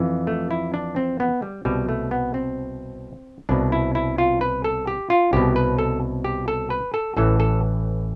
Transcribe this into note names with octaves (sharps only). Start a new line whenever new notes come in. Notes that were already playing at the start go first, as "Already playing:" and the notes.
Already playing: F2 E3
A3
E4
D4
C4
B3
G3
C2 B2 G3
A3
B3
C4
C2 B2 D4
E4
E4
F4
B4
A4
G4
F4
C2 B2 G4
B4
A4
G4
A4
B4
A4
A1 A2 E3 A4
A4